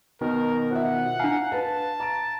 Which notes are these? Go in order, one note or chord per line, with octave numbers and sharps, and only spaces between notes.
B2 D#3 A#4
F4 C5 E5 F#5
D4 F5 G#5 A#5
B4 A5
A#5 D7